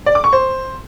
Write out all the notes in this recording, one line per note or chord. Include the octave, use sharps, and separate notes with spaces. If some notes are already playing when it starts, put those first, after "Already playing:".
D5
D6
C#6
C5